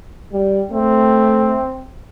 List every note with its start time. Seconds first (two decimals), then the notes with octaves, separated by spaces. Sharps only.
0.33 G3
0.72 A3 C4